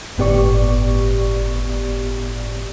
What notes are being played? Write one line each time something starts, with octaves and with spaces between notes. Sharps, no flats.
G1 A2 B3 G4 D5 C#6